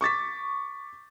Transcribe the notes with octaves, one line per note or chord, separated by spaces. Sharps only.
C#6 D6 A6 B6